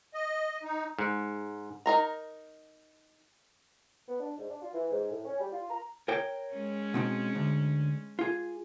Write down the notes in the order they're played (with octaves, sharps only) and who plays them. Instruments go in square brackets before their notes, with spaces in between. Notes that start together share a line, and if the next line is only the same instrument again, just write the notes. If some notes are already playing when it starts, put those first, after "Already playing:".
[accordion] D#5
D#4
[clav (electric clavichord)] G#2
[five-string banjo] D#4 A#4 A#5
[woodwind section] B3
D4
G#2
D4
F4
E3
G#2
A2
C#4
G3
F4
A#5
[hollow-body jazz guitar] A#4 C#5 G5
[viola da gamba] G#3 C#4
[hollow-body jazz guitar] B2 C4 D#4
D2
F4 G#4